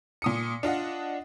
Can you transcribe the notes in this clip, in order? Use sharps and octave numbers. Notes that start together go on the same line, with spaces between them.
A#2 D#6 C#7
D4 F4 D#5 F#5